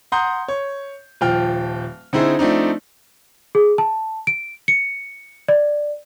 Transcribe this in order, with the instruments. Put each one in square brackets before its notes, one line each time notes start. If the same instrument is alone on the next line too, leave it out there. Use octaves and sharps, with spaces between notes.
[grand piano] F#5 A#5 C6 D#6 G6
C#5
D#1 F3 G5 F6
D3 C4 D#4 E4 G#4 C5
F3 A3 C4 D4 D#4
[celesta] G#4
A5
D7
C#7
D5